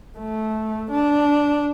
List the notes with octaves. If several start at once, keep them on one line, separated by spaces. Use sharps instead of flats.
A3
D4